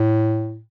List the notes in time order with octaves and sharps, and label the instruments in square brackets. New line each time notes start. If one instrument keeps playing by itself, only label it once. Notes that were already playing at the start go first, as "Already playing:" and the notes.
Already playing: [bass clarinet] A2